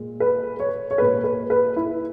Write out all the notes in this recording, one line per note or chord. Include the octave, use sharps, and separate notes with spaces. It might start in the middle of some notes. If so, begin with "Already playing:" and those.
Already playing: A#2 G#3
B4
C#5
C#5
A#2 G#3 B4
B4
B4
E4